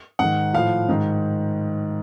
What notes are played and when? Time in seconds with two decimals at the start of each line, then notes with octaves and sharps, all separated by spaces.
0.19 G#2 D#3 F#5
0.54 A2 F3 F5
0.89 G#2 D#3